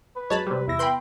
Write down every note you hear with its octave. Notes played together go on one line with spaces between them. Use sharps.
B4
F#2 F#3 G#3 C#5 A5 B5
C3 G3
E2 E4 A#6
B3 G5 B5 C6 G6